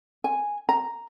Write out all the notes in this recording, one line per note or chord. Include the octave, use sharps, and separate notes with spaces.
G#5
A#5